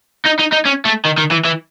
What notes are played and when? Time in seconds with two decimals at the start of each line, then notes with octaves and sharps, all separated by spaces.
0.26 D#4
0.39 D#4
0.53 D#4
0.66 C#4
0.85 A3
1.05 D#3
1.18 D#3
1.31 E3
1.45 E3